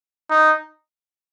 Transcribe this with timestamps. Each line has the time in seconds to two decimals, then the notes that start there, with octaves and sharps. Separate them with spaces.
0.30 D#4